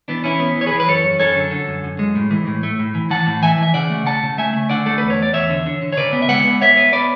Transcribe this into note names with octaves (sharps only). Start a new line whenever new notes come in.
E3 B3 D4
E3 C#4 E4
B3
E3
C#5
G#4 B4
E3
B4
F#2 A4 C#5
F#2
F#2 A4 C#5
D3
D3
F#2
F#2
G#3
A2
E3
A2
A3
A2
E3
E3 F#5 A5
A2
E3 E5 G#5
E3 E5
C#3 D5 F#5
A3
A3 F#5 A5
C#3
A3 E5 G#5
A3
D3 D5 F#5
A3 A4
E2 B4
C#5
E2 D5
E2 C#5 E5
D3
D3
D3
C#5
C#3 B4 D5
B3
E5
G#3 D5 F#5
B3
B3 C#5 E5
B3
B3 B4 D5